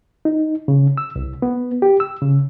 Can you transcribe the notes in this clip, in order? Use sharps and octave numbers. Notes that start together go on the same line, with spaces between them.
D#4
C#3
E6
C2
B3
G4
E6
C#3